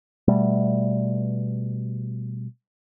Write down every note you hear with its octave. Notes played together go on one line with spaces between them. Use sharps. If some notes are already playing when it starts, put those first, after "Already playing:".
B2 G3 A3